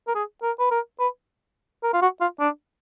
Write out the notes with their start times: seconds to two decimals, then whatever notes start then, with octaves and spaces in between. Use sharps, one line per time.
0.07 A#4
0.15 G#4
0.43 A#4
0.59 B4
0.71 A#4
0.99 B4
1.83 A#4
1.93 F4
2.02 F#4
2.21 F4
2.40 D4